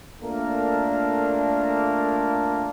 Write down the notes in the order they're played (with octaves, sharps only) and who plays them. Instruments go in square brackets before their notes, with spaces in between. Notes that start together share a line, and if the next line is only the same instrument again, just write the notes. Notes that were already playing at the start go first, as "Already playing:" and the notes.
[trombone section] A3 A#3 D4 F4 A4 A#4